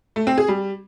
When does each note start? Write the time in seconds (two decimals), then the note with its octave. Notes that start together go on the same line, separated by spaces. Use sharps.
0.16 A3
0.27 C4
0.38 G#4
0.48 G3